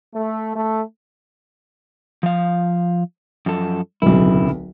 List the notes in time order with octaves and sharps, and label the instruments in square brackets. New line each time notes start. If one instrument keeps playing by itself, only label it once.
[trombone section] A3
A3
[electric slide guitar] F3 F5
F#2 F3 A4
[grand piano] D1 B1 [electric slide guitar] C#3 E4